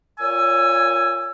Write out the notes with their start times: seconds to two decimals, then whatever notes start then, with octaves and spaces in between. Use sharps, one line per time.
0.19 A#2 C#5 G#5 E6